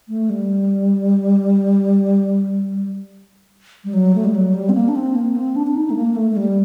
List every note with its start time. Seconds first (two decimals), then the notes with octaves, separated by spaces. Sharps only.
0.08 A3
0.30 G3
3.85 G3
3.94 F#3
4.15 A3
4.25 G3
4.35 F#3
4.54 G3
4.69 C4
4.74 A#3
4.88 D4
4.96 C4
5.15 A#3
5.36 C4
5.56 D4
5.67 D4
5.76 D#4
5.90 A3
5.96 A#3
6.16 A3
6.31 A3
6.37 G3